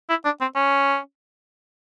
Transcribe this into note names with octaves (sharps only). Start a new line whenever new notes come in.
E4
D4
C4
C#4